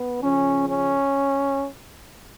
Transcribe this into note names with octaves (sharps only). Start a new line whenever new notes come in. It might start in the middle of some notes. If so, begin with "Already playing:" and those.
Already playing: B3
C#3 F3 C#4
C#4